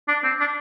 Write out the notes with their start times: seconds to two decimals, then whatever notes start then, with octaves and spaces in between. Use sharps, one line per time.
0.08 D4
0.24 C4
0.40 D4